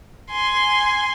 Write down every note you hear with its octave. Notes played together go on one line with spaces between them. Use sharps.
G#5 C6